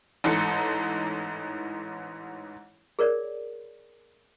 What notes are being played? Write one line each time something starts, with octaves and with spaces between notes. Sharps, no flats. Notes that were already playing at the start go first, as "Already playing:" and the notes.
A1 G#2 E3 D#4 A4 C#7
G#4 A#4 C#5 D5